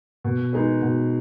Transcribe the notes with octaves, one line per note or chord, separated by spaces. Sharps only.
B2
G#3 D#4 G#4 B4
B2